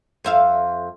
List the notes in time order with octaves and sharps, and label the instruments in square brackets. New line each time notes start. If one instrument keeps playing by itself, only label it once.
[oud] F2 E5 F5